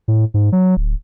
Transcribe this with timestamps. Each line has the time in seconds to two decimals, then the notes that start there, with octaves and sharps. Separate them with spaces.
0.08 A2
0.34 G#2
0.52 F#3
0.77 D1